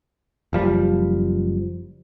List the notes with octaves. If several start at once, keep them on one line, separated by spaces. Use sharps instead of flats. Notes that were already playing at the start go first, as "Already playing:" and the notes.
F#1 F3 G3